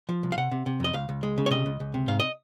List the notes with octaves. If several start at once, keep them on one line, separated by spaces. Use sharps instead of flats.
F3
C2
F5
C3 F#5
C3
C3
F2 D#5
C#2 F5
C#2
G#3
C#3
C#5
C3 D#5
C#2
C#2
C3
G#2 F5
D#5